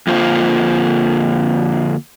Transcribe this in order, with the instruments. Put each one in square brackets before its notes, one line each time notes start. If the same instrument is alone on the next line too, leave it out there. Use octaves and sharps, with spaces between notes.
[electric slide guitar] F2 D3 A#3 F4 C5